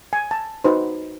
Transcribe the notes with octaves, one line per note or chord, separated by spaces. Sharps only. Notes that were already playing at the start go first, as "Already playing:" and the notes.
G#5
A5
D#4 F#4 B4 C5